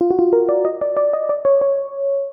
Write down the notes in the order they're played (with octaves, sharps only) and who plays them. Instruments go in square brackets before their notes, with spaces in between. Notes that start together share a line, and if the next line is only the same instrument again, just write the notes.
[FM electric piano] F4
F#4
F4
A#4
D5
D#5
D5
D5
D#5
D5
C#5
C#5